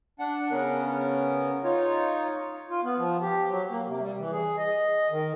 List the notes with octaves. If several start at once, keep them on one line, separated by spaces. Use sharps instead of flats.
D4 F#5
C#3 B3 C#4 A#4
D#4 F4 C#5
F4
B3
F3
G4
F#3
A#3
C3
G3
E3
G#4
D#5
D#3